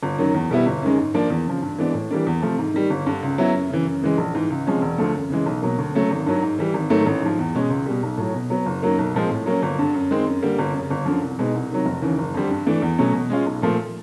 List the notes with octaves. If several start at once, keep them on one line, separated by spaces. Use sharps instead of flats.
G1
F#2 D#3 F#3
E2
B2 G3 B3 E4
G1
F#2 D#3 G#3 C#4
G#2
F3 A#3 D4
E2
C#3 F3
G2
E3 G#3 B3 D4
A2
E3 G3 A#3 D4
E2
C3 F3 A3
G#2
D#3 G3
G1
G2 D3
C#2
C#3 F#3 B3 E4
F#2
C#3 E3
F#2
C#3 E3 G#3
A#1
G#2 E3
C#2
C3 F3 G#3 C#4
E1
D2 D3 F3 A3
F#2
C#3 E3 G#3
B1
B2 F#3 A#3
D2
C#3 F#3 A3
G#1
G2 D#3 F#3
G#2
E3 G3
G#1
G#2 D#3 F#3 A3
A1
G#2 F3
E2
B2 G#3 C#4
C#2
B2 G3
B1
A2 F#3
B2
F#3 B3
F#1
F#2 D#3 F#3 A#3
B1
A#2 F3 G#3 C4
A2
F#3 A#3 C#4
G1
G2 D3
F#2
D#3 G#3 C4
F#2
D3 G3 A#3
G1
F#2
C#3
G1
F#2 D3 F3
C2
B2 G#3 B3 D#4
C2
C3 D#3 F#3
F1
D#2 C#3 E3
F#1
F2 D3 G3 C4
G2
E3 A3 D4
E2
B2 F#3 A3 C#4
B2
G#3 C#4 F4
B1
A#2 F3 A3